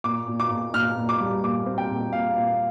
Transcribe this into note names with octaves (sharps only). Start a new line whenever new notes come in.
A#2 D6
A#2
D6
A#2
A#2 F6
A#2
D6
G3
A#2 D6
C4
G5
A#2
A#2 F5
A#2